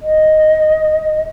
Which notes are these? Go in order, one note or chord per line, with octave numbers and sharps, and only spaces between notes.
D#5